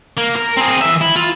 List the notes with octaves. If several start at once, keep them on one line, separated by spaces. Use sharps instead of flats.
A#3
A#4
C4 G#4
E3 E5
E4
F4